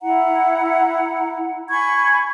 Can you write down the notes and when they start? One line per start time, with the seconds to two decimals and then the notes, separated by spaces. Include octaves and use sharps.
0.02 E4 F#5 A#5
1.70 G#5 B5 C#6 G#6